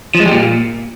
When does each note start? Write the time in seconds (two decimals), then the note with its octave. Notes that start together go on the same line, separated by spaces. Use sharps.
0.15 F3
0.20 G#3
0.26 G3
0.31 A#2